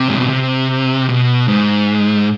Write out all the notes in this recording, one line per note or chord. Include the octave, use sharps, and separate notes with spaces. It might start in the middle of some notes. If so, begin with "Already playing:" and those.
Already playing: C3
G#2
B2
C3
B2
G#2